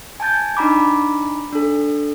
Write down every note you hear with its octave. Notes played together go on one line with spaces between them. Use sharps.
G#5 A5 G6 A6
D4 D#4 A#5 B5 D6
D4 A4